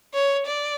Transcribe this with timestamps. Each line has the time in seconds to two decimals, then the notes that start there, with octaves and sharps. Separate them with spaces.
0.14 C#5
0.46 D5